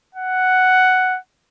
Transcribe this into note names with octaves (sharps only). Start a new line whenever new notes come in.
F#5